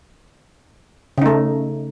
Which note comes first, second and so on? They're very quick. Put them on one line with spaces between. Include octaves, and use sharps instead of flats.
C#3 D#4 A3